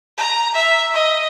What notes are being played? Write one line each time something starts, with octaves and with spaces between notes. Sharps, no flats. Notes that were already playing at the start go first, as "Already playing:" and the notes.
A#5
E5
D#5